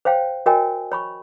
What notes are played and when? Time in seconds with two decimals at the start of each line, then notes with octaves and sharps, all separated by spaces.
0.05 C5 C#5 F5 G5
0.46 F#4 A#4 C#5 D#5 G5 G#5
0.92 C#5 B5 C#6